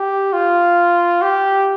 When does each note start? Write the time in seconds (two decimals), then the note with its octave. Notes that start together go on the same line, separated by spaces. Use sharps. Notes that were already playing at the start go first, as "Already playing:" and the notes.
Already playing: G4
0.33 F4
1.22 G4